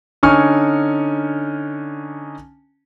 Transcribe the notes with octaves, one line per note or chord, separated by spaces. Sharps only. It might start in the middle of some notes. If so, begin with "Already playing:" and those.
D3 C#4 D#4 G#5 C#6 F6